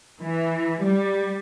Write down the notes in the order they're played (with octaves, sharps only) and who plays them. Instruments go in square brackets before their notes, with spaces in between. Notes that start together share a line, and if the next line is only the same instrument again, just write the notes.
[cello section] E3
G3